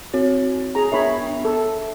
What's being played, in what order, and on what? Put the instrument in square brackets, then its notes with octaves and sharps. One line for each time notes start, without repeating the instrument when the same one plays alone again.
[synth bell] C4 F#4 C#5
[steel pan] G#4 A#5
[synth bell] B3 D4 E5 [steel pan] A#4 C#5 B5
[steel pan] A4